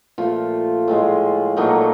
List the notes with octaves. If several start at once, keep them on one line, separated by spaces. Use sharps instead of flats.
A#2 F3 A3 F4
A2 F3 G#3
A#2 F#3 A3 D#4